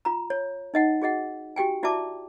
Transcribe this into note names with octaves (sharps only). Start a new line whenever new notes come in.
F4 A#5
C#5
D#4 D#5 F#5
F#4 G#4 D#5 F#5
F#4 G4 G5 G#5
E4 F#4 D5 E5 A5 D6